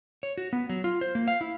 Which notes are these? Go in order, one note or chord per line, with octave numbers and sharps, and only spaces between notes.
C#5
F#4
B3
F#3
F4
C5
A#3
F5
E4